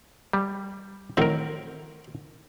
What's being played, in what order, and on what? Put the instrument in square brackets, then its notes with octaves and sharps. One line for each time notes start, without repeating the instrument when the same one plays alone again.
[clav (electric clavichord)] G3
[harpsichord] A2 D#3 F#3 [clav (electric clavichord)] C4 A#4